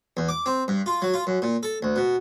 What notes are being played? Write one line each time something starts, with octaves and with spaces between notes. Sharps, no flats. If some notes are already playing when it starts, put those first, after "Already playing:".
E2
D6
C4
G2
F4
F#3
F4
F#2
A#2
A4
D2
B2